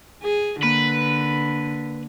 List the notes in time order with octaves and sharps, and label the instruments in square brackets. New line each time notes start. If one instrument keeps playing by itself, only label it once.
[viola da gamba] G#4
[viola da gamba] D3 [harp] A#3 [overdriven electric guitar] B4